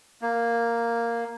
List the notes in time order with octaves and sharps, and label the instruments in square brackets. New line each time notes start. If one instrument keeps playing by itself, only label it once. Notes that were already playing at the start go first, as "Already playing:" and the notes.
[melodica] A#3